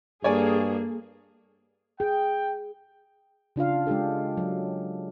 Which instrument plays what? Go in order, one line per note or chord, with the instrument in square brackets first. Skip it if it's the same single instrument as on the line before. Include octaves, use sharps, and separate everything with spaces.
[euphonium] G2 [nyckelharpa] A#3 A4 [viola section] G#4 [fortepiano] C#5 D5 G#5
[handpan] G#4 [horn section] G5
[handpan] C#3 D4 F4 F5
G#3 D4 G4 A4
F#3